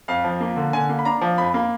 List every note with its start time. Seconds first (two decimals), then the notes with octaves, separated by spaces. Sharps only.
0.08 F2 F5
0.24 F3
0.40 A#3
0.56 D3
0.73 D3 G#5
0.89 A#3
0.99 B5
1.05 D4 A#5
1.21 F3
1.38 F2 B5
1.54 A#3